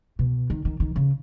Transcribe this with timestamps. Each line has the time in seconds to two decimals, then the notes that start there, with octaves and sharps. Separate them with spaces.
0.19 B2
0.50 D#3
0.65 D#3
0.80 D#3
0.96 C#3